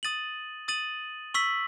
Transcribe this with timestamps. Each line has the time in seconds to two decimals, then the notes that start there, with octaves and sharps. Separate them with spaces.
0.03 D#6 A6 D#7 F#7
0.68 D#6 A6 D#7 F#7
1.34 C#6 E6 B6 F#7